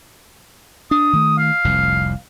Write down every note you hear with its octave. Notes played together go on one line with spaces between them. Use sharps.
D4 D#6
D#3 A3
F5
F1 C2 F2